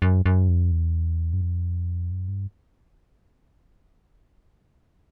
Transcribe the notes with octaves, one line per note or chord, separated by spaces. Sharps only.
F#2
F#2
F2
E2
F#2
F2
F#2
G2